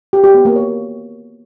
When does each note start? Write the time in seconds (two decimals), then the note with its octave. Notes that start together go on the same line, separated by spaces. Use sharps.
0.13 G4
0.24 G4
0.34 B3
0.45 A#3
0.56 C#5